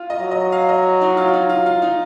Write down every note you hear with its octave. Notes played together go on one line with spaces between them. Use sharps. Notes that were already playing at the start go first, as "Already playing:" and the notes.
Already playing: F4
D#5
F#3
D#5
F5
D#5
D#4
F4
F4
D#4
F4
F4
D#4